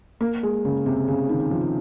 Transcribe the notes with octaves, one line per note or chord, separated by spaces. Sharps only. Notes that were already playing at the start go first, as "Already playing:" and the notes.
A#3
G#3
C#3
C3
C#3
D#3
F3